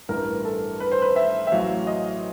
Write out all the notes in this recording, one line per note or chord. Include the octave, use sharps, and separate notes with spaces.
A1 G2 E3 A#4
A4
B4
C5
B4
E5
E5
A1 A2 F#3 F5
D#5